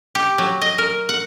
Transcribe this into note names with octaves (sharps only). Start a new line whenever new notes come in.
G4
F#3
D#5
A#4
F#5